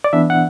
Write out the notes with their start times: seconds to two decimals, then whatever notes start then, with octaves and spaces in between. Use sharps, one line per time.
0.04 D5
0.13 E3 B3 D4 E5
0.30 F#5